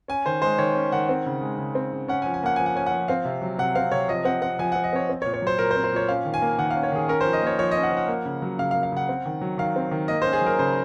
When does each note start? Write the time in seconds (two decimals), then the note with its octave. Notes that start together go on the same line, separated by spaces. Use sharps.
0.08 C#4 G#5
0.26 D#3 C5
0.42 G#3 C5
0.58 D#3 C#5
0.75 C#4
0.92 D#3 F#5
1.09 C4
1.26 C#3
1.42 G#3
1.58 C#3
1.75 C4
1.93 C#3
2.08 C#4 F#5
2.22 G#5
2.26 F3
2.34 G#5
2.43 A#3 F#5
2.56 F3 G#5
2.66 F#5
2.76 C#4 G#5
2.86 F#5
2.92 F3
3.08 C4 F5
3.25 C3
3.42 F#3
3.58 C3 F#5
3.75 C4 F5
3.92 C3 C#5
4.08 F3 D#5
4.25 C4 F#5
4.42 C4 F#5
4.59 F3 G#5
4.72 F3 F#5
4.84 D#5
4.93 C4 C#5
5.09 C4
5.22 C#5
5.25 A#2
5.34 C#5
5.42 F#3 C5
5.59 A#2 A#4
5.71 C5
5.75 C4
5.84 C5
5.92 A#2 C#5
6.09 C#4 F5
6.25 D#3
6.34 G#5
6.42 A#3
6.58 D#3 F#5
6.71 F5
6.75 C#4
6.83 C#5
6.92 D#3 G#4
7.08 C#4 A#4
7.21 C5
7.25 F3
7.33 D#5
7.42 A#3 C#5
7.59 F3 C#5
7.71 D#5
7.76 C#4
7.83 F#5
7.92 F3
7.97 F#5
8.08 A#3
8.25 C#3
8.42 F#3
8.58 C#3 F5
8.71 F5
8.75 A#3
8.83 F5
8.92 C#3 F#5
9.09 C4
9.26 D#3
9.41 F#3
9.58 D#3 F5
9.76 C4
9.91 D#3
10.08 A#3 D#5
10.22 C#4 C5
10.33 G#4
10.42 F#3 A#4
10.59 C#3 C5